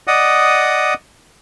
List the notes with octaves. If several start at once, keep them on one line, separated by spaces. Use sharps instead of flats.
D5 D#5 F#5 D#6